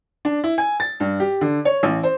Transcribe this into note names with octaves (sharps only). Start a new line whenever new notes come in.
D4
E4
G#5
A6
G2
G4
D3
C#5
A1
C5